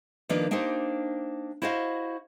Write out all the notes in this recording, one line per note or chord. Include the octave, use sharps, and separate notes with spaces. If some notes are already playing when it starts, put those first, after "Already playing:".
D#3 F3 A#3 D4 B4 D5
A#3 D4 D#4 G4 C5
E4 F#4 C5 D#5 F5